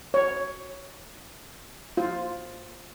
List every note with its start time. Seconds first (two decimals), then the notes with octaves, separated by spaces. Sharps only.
0.14 C#5
1.97 F4